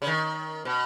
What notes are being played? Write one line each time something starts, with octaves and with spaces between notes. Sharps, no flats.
C#3
D#3
B2